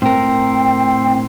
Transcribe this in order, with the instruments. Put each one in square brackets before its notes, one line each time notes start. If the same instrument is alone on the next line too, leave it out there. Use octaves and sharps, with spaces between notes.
[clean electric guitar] A2 A#4 [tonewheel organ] C4 [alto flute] G5